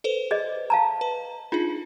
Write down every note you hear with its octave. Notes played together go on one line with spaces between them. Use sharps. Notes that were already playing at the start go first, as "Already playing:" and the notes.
A4 B4 C5
G#4 D5 D#5
F5 A5 A#5
B4
D4 D#4 F4 G#4